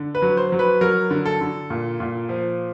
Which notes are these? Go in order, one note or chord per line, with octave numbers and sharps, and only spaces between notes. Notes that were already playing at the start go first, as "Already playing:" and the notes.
Already playing: D3
B4
F#3
C5
F#3
B4
F#3 A#4
D3
A4
D3
A#2
A#2
F3